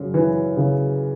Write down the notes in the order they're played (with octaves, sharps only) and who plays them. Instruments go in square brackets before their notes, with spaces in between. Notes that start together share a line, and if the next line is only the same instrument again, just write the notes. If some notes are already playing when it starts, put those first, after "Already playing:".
Already playing: [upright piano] F#2 C#3
E3
C#3